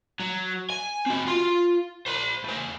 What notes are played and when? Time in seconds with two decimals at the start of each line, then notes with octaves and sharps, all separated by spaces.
0.20 F#3
0.70 G#5
1.07 C4 F#4
1.27 F4 C6
2.06 C5 B5
2.44 A3 C5